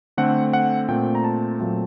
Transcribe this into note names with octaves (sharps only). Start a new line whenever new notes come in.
D3 A3 C4 F#5
F#5
A#2 A3 C4 G5
A#5
A5
A#2 F#3 A3 C4